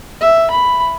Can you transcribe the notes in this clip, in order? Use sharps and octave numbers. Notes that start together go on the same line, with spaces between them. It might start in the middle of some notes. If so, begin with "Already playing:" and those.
E5
B5